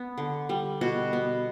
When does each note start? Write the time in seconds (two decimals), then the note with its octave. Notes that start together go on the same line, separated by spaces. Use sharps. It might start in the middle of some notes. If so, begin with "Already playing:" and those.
Already playing: B3
0.18 D3
0.49 G3
0.81 B2 F#4
1.13 B3